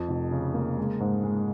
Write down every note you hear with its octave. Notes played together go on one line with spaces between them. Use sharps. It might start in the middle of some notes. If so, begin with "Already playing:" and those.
Already playing: F2
F1
C#3
A#3
G#3
G#2
G#3